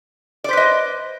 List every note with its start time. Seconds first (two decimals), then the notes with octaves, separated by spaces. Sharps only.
0.44 D5
0.49 C5
0.53 B4
0.57 D#5